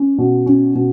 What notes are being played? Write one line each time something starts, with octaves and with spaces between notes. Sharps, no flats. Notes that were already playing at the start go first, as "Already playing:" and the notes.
Already playing: C#4
B2
C#4
B2